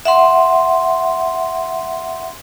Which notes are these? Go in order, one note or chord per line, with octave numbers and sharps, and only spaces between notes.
E5 F#5 C6